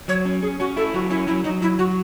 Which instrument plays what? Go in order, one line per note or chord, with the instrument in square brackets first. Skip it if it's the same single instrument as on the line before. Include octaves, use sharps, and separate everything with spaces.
[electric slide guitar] F#3 [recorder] C#5
[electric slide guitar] C#4
[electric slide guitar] C#4 [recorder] G#4
[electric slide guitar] C#4 [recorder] F#4
[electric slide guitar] E4 [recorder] A4
[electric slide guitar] F#3 [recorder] F#4
[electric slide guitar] C#4 [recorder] E4
[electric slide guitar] F#3 [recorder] E4
[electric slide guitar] F#3 [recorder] D#4
[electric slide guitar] F#3 [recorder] E4
[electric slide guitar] F#3 [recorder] F#4